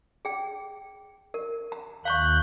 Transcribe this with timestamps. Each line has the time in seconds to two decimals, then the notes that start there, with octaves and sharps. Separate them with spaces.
0.25 G#4 G5
1.34 A#4
1.72 A#5
2.05 D#2 F5 A#5 C#6 F#6 G6